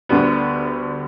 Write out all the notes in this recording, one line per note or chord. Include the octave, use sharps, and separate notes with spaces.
D2 D3 G3 B3